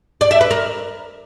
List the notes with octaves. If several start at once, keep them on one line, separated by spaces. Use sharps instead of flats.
D5
E5
B4
A#4